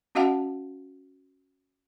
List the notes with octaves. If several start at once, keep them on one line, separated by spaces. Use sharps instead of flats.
C#4 F#4 D#5 F5 F#5 A5